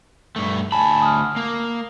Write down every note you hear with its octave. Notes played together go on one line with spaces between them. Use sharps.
G2 A3
D2 G#5 A5 B5
D#6 F6
A#3